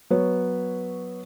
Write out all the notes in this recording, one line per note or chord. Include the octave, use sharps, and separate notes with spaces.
F#3 B3 C#5